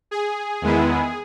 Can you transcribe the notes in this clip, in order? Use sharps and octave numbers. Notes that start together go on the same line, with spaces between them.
G#4
E2 D#3 G#3 B3 E4